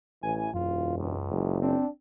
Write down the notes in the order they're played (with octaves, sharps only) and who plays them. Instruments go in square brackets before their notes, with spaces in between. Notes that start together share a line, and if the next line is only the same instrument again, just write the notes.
[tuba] A1 [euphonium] E3 [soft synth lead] G#5
[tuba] E1 [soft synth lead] F#2 [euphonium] F4
[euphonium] C#2
[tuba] F#1
[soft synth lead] C4 [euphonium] D4